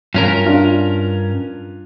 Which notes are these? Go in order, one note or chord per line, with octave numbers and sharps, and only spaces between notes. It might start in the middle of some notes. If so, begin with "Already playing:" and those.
G2 C#4 F4 A#4
D4 F4